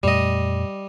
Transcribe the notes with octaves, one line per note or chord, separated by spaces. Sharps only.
F2 A#2 G3 A3 D#5